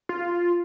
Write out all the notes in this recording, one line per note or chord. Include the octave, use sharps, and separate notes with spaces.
F4